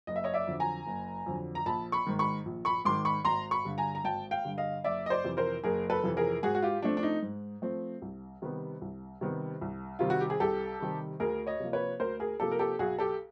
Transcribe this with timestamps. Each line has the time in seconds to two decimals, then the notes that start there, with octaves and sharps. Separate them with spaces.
0.07 F#1 D#5
0.16 E5
0.24 C#5 D#5
0.34 D5 E5
0.47 F2 D3 F#3
0.60 G#5 A#5
0.86 F#1
1.26 F2 D3 F#3
1.55 A#5
1.66 A#1 A5 B5
1.92 B5 C#6
2.06 G#2 D#3
2.19 B5 C#6
2.45 A#1
2.65 B5 C#6
2.85 G#2 D#3 C6 D6
3.05 B5 C#6
3.25 G#1 A#5 C6
3.51 B5 C#6
3.65 G2 D3
3.78 G#5 A#5
3.95 A#5
4.04 G#1 G5 A5
4.31 F5 G5
4.45 G2 D3
4.58 D#5 F5
4.84 F#1 D5 E5
5.06 D#5
5.10 C5 D5
5.24 F2 C3 E3
5.37 A#4 C5
5.63 F#1 G#4 A#4
5.90 A4 B4
6.03 F2 C3 E3
6.17 G#4 A#4
6.43 G#2 F#4 G#4
6.55 F#4
6.62 F4 G4
6.82 F3 A3 C4 D4
6.97 D4
7.03 D#4
7.22 G#2
7.62 F3 A3 C4
8.02 C2
8.42 C3 D#3 G3 B3
8.81 C2
9.21 C3 D#3 G3 B3
9.61 C2
9.99 C3 D#3 G3 F4
10.10 F#4
10.20 G4
10.30 G#4
10.40 C2 G4 A4
10.80 C3 D#3 G3
11.20 D2 G#4 A#4
11.47 C#5 D#5
11.60 C3 F3 A#3
11.73 B4 C#5
12.00 D2 A#4 C5
12.20 G#4 A#4
12.40 C3 F3 A#3 G4 A4
12.51 A#4
12.59 G4 A4
12.79 B1 F#4 G#4
12.99 G4 A4